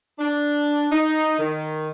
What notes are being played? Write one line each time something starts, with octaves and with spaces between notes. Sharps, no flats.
D4
D#4
D#3